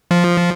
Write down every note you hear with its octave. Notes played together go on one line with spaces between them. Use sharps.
F3